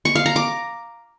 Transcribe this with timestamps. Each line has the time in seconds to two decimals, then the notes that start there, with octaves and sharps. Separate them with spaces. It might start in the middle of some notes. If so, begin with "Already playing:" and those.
0.05 C#6
0.15 F5
0.26 A#5
0.36 D6